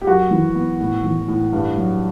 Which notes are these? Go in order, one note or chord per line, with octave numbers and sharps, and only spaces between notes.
G4
F#2 F#4
E3
B3
A2
E3
A2
G2
F#3